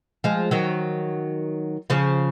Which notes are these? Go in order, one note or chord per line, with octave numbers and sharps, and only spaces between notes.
F3 G#3
D#3 F#3
C#3 F3